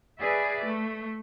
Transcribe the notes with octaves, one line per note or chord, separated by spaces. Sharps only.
G#4 B4 D5 E5
A3